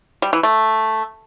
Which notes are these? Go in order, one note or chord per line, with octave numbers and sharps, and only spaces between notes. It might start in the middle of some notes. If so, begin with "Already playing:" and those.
G3
E3
A3